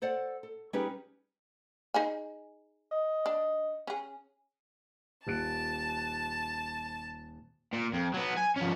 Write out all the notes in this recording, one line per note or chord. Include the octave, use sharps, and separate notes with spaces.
A4 C5 D5 F#5
A4
G3 C#4 D#4 G4 G#4 B4
D#4 G#4 G#5
D#5
D4
C#4 G#4
D#1 A5 F#6 D7
A#2
F2
F#3 B3
G#5
F3 C#4